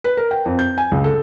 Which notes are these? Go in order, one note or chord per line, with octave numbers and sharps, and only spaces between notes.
B4
A#4
G5
F2
G6
G#5
C#2
A4